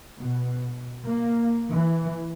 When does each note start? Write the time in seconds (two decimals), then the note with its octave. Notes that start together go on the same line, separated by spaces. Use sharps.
0.17 B2
1.05 A#3
1.71 E3